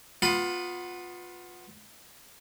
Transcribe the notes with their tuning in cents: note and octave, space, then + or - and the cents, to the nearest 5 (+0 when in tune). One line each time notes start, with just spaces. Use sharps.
B3 +0 F4 +20 B5 +25